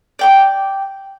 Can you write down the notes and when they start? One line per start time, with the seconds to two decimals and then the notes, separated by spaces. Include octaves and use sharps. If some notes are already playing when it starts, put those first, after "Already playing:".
0.19 D5 G5 D6